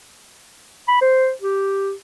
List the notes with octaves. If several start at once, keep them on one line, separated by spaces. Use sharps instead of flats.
B5
C5
G4